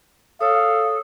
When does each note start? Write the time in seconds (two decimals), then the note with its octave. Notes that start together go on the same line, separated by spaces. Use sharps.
0.40 A4 C#5 F5 D#6